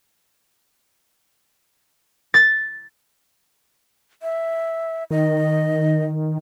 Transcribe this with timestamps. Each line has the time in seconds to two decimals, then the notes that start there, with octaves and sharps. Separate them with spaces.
2.34 A6
4.23 E5
5.11 D#3 D#5